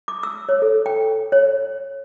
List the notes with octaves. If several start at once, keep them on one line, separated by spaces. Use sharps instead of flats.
D6
E6
C#5
A4
G5
C#5